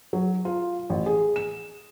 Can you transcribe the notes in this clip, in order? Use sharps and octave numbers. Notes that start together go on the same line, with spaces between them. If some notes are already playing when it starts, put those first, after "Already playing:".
F#3
F4
A1
G#4
E7